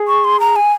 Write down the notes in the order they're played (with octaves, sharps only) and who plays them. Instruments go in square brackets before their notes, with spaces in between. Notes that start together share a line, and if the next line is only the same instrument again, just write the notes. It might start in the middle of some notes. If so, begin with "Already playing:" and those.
Already playing: [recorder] G#4
[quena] C#6
C6
A#5
G#5